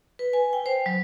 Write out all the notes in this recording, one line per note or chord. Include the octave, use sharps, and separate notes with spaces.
B4
G#5
G5
C5
F#3